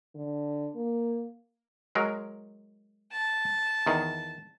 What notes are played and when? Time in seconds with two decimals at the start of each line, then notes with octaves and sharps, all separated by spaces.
0.15 D3
0.75 A#3
1.95 F#3 G#3 A#4
3.12 A5
3.87 E2 D#3